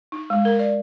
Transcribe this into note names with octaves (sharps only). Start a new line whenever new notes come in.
D#4
G#3
A#4
D5